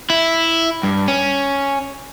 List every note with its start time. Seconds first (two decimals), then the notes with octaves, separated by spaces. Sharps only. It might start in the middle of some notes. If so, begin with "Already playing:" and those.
0.10 E4
0.83 G2
1.08 C#4